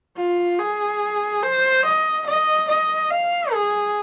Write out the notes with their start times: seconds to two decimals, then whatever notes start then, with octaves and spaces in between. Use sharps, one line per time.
0.16 F4
0.59 G#4
1.43 C5
1.85 D#5
2.26 D#5
2.68 D#5
3.11 F5
3.53 G#4